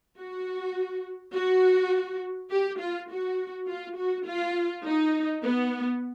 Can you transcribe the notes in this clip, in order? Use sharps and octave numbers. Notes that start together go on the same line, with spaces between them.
F#4
F#4
G4
F4
F#4
F4
F#4
F4
D#4
B3